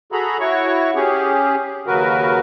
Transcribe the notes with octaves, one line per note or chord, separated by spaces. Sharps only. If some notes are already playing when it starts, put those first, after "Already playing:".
F#4 G#4 A4 A#5 B5
E4 F#4 C#5 C#6
C#4 G4 G#4
D#2 C#3 F#3 F#4 A#4 B4